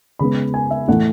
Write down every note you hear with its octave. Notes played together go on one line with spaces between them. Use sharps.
C#3 G#3 B3 B5
G#5
E5
A2 E3 A3 F#5